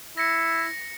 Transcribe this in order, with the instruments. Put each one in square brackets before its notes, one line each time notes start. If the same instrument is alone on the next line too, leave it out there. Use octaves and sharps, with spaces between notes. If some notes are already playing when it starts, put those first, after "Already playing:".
[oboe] E4 [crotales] A#6 C#7